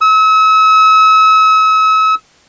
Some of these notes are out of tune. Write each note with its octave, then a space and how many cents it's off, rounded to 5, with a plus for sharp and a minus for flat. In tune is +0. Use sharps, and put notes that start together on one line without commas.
E6 -40